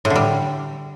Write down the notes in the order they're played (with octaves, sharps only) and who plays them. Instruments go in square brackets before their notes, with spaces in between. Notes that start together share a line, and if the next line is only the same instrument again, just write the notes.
[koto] A2
D3
G3